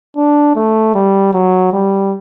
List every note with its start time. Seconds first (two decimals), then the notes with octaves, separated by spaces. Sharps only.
0.17 D4
0.56 A3
0.95 G3
1.33 F#3
1.73 G3